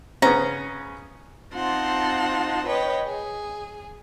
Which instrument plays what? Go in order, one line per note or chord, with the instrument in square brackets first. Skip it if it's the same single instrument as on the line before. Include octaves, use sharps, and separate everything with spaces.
[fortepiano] C#3 B3 C#4 [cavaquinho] A#5
[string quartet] C4 D#4 F4 F#5 A5 C6
B4 C#5 D#5 G5
G#4